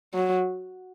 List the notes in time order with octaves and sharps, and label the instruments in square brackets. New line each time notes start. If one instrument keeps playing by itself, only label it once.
[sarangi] F#3